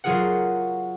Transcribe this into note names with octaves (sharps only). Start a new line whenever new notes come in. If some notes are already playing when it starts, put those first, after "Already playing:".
F#3 F4 G#4 A#4 F#5